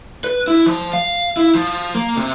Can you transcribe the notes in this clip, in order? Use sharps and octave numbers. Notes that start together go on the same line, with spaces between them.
B4
E4
F3
F5
E4
F3
A#3
C3